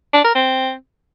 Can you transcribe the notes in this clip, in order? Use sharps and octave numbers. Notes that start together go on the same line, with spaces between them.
D4
A#4
C4